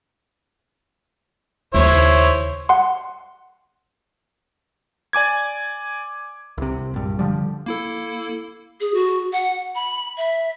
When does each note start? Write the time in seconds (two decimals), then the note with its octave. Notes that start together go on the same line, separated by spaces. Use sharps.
1.74 D#2 C#3 E4 C5 C#5
2.69 F#5 C6
5.13 D5 G#5 D6 G#6
6.58 C2 C3
6.94 A#1 G2
7.19 D3 F3 G3
7.66 A#3 E4 A4
8.80 G#4
8.94 F#4
9.33 F#5
9.75 B5
10.17 E5